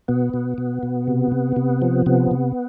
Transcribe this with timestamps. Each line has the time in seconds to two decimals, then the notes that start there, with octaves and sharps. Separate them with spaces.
0.08 B2 B3
0.34 B2
0.58 B2
0.83 B2
1.07 C3
1.32 C3
1.56 C3
1.82 F3
2.06 C3 B3
2.31 C3